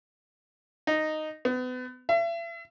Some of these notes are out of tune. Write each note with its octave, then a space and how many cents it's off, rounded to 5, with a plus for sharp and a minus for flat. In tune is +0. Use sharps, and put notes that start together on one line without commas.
D#4 -5
B3 +35
E5 +40